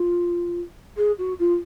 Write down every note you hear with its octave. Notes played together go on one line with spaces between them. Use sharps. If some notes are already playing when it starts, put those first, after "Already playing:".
Already playing: F4
G#4
F#4
F4